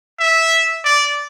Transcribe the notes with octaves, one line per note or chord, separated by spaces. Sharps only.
E5
D5